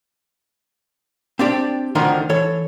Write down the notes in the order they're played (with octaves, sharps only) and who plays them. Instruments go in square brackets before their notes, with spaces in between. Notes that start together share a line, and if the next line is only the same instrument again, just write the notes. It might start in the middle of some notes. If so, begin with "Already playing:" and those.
[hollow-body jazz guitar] C4 D4 G4 D5
D2 D3 D#3 F3 D#4 C6
E3 A4 C#5